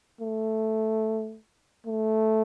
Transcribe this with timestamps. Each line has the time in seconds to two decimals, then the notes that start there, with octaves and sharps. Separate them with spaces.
0.21 A3
1.87 A3